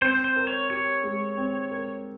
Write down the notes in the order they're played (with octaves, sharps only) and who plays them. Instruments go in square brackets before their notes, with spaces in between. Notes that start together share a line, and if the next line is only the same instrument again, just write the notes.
[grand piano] C4 [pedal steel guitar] C5
[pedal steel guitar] C5
[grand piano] A#4
[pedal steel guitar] C#5
[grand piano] G4 [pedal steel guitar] C#5
[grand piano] G#3
C4
A#4